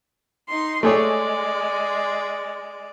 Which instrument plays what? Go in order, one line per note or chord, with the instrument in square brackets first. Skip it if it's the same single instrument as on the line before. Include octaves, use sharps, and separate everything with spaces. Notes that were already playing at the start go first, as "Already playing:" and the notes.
[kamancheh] D#4 C6
[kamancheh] G#3 D5 [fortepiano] A3 G#4 C#5